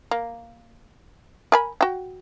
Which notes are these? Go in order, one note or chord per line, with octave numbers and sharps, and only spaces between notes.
A#3
A#4 G#5 B5
F#4 G5